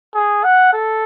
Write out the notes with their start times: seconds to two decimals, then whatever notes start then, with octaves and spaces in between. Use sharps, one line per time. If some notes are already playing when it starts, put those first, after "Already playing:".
0.14 G#4
0.44 F#5
0.73 A4